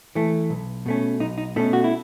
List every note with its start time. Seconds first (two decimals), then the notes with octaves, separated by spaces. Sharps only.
0.15 E3 A3
0.50 B1
0.86 B2 A3 C#4
1.20 B1 D#4
1.38 D#4
1.56 B2 A3 C#4 E4
1.73 F#4
1.84 E4